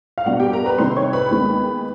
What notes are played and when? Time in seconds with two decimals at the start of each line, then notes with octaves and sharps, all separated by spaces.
0.18 F5
0.26 B2 G3 B3 D4 F#4 F#5
0.40 G4 G5
0.52 A#4 A#5
0.66 B4 B5
0.78 C3 D#3 G3 C4 C5 C6
0.96 C#5 C#6
1.13 B4 B5
1.31 D#2 D#3 G#3 B3